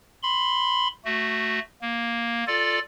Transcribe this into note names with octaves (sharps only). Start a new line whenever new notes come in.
B5 C6
A3 F#4
A#3
F4 A4 D5